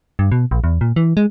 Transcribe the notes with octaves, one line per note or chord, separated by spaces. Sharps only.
G2
B2
A#1
E2
A#2
E3
G#3